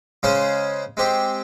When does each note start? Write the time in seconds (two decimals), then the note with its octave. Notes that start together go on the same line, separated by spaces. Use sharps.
0.23 C#3 G#3 C#4 G#4 C5
0.97 G#3 C4 G4